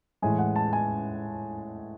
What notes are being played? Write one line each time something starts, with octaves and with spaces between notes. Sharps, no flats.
A2 E3 G#3 G#5
F#5
A5
G#5